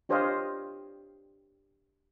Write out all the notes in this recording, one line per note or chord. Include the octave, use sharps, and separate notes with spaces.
D4 G4 C5 C#5 D#5 F5